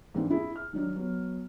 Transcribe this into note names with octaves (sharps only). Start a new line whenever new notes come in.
G#2 E3 A#3 C4 D4
E4 G#4
F6
D#3 F#3 D4 D#4
F#3 B3